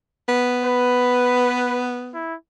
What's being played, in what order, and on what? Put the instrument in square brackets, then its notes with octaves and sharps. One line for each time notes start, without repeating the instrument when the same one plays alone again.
[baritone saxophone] B3
[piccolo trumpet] B4
E4